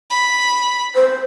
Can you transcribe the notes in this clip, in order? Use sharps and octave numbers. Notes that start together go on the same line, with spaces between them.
B5
C5